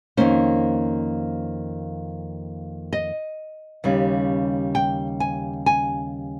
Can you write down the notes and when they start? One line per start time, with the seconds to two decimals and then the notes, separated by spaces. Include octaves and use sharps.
0.17 F2 D#3 A#3 C#4 C5
2.93 D#5
3.84 D#2 C#3 G3 C#4
4.75 G5
5.20 G#5
5.66 G#5